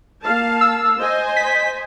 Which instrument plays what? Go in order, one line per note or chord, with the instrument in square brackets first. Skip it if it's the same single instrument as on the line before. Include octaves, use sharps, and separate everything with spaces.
[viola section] A#3 F5 A5
[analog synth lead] E6
[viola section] C5 D#5 G#5
[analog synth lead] B6